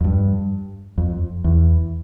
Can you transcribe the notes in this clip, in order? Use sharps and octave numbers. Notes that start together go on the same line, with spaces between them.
F2
G2
F2
E2